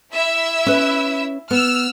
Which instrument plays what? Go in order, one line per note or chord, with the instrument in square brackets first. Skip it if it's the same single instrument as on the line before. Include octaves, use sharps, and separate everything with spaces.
[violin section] E4 E5 E6
[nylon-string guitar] C#4 B4
[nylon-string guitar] B3 [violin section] E6 F6